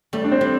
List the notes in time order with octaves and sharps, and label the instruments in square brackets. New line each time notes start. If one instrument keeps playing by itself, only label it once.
[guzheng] G3 [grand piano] A3
[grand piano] D4
C4
[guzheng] G3